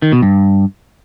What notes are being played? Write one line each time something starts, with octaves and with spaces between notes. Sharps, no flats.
D#3
B2
G2